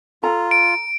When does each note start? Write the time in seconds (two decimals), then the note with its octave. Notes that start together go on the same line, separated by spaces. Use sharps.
0.23 F4 A4 A#5
0.51 D7